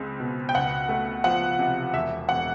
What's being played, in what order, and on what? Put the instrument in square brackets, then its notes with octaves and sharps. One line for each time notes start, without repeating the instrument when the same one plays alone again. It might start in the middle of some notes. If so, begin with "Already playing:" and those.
Already playing: [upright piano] C#2 G#3 C4
B2
G5
C#2 F#5
A3
F3 F#5
C3
E1 E5
E1 F#5